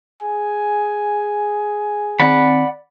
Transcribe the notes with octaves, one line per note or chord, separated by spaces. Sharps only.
G#4 G#5
D#3 C4 D5 F#5 B5